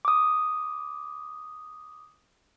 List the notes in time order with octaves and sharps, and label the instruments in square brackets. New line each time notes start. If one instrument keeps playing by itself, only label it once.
[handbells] D6 D#6